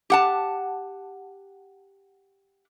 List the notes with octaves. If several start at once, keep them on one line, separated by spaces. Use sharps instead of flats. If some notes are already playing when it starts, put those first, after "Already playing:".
G4 F#5 A5